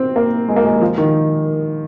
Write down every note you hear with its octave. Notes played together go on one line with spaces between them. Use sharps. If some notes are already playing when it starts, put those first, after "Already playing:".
Already playing: C4
A#3
G#3
A#3
G#3
F3
D#3